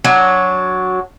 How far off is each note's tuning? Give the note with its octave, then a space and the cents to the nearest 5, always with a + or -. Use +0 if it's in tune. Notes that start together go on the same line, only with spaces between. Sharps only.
F#3 +0 D4 -10